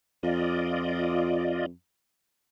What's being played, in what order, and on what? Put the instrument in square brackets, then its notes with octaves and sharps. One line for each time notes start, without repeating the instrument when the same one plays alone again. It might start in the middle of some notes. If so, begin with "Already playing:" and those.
[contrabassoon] F2 [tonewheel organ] F4 D5 D#5